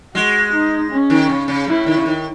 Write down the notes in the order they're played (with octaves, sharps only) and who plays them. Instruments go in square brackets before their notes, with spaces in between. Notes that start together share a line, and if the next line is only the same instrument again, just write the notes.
[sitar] G#3 [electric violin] F#4
[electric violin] D#4
C#4
[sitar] D#3
C#3
C#3
[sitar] A2 [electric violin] E4
[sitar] D#3
C#3
D#3